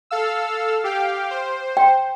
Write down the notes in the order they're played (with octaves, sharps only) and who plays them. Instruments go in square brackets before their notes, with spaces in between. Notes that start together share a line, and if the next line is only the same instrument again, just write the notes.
[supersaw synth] A4 F5 E6
G4 F5 G5
C5
[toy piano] G5